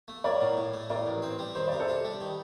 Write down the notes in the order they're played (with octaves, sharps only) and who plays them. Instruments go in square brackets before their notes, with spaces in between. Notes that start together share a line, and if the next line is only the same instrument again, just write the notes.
[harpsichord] A3
[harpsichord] F#3 [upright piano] A#4 D5
[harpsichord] A2
A2
A3
[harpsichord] A2 [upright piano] A#4 D5
[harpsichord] A1
C4
G3
[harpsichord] D#3 [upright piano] C5
[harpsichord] C3 [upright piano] D5
[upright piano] A4 C5
[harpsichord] D4
G3
D#3